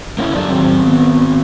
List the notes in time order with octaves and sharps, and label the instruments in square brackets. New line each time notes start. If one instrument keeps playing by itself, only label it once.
[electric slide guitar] A#3 C#4 E4
[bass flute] F#3 [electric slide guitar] D4 G4 A4
[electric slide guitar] D#3 C4
[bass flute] B3